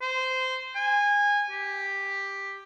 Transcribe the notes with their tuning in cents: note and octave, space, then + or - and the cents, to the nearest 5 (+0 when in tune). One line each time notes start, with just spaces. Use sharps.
C5 -15
G#5 -20
G4 +5